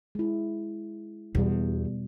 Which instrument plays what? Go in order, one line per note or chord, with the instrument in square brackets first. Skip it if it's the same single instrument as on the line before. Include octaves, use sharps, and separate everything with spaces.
[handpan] G#3 E4
[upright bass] E2 [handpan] B2 G3